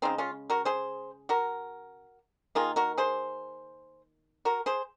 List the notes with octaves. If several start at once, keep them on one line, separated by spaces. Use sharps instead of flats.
C#3 G#3 C4 D#4
C#4 F4
F#4 A#4
G#4 C5
F#4 A#4
D#3 A#3 F4 G#4
F#4 A#4
G#4 C5
F#4 A#4
G#4 C5